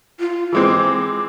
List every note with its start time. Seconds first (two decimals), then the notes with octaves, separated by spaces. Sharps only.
0.20 F4
0.53 E3 G#3 C4 D6